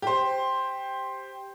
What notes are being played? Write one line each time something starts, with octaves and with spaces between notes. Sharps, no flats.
G4 C5